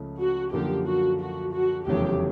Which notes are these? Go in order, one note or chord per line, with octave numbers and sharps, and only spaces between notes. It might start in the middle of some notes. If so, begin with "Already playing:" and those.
Already playing: C#2 C#3 F3 A3
F#4
F#2 D3 F3 A#3 G4
F#4
F#4
F#4
F1 E2 C#3 F#3 A3 G4